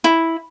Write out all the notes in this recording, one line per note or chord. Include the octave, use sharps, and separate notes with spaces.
E4